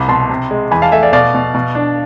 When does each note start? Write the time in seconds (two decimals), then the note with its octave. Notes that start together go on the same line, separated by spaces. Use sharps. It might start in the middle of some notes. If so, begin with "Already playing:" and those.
Already playing: C2 C3 B5 D6
0.08 B2 A5 C6
0.29 C3
0.51 G#3
0.71 E2 G#5 B5
0.82 F5 A5
0.92 A3 E5 G#5
1.03 D5 F5
1.13 B2 D5 F5
1.35 B2
1.55 B2
1.75 D4